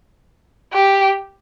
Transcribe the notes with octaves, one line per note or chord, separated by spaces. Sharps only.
G4